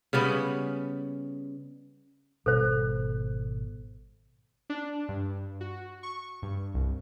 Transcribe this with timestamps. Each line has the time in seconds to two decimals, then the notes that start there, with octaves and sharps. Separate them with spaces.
0.13 C#3 G3 B3 C#4
2.46 G#1 B2 G3 A4 C5
4.70 D4
5.09 G2
5.61 F#4
6.03 C#6
6.42 G2
6.74 C2